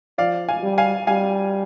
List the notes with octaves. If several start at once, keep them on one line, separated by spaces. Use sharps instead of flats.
F3 D5 F5
F5 G#5
G3
F5 G#5
G3 F5 G#5